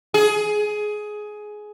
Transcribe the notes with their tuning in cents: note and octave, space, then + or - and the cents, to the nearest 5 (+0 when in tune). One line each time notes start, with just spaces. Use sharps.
G#4 +15